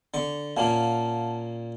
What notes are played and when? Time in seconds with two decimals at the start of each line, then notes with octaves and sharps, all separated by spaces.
0.14 D3 C#6
0.57 A#2 A#3 C#4 F5 F#5 A5